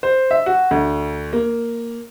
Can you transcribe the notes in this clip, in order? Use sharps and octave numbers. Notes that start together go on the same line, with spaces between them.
C5
E5
F#4
D2
A#3